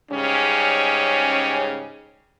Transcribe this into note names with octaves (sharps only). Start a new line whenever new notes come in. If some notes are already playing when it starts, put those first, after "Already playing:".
G#2 C#3 G3 C#4